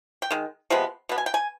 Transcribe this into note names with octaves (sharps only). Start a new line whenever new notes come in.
G5
D#3 G#3
C3 F3 G#3 B3
B2 B3
G#5
G5
G#5